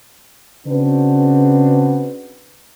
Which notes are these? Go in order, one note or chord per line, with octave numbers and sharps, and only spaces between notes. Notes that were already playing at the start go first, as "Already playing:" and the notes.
C#3 C4 D4 F#4 B4